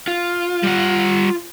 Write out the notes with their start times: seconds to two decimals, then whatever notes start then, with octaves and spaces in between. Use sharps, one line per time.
0.08 F4
0.63 G3 F#5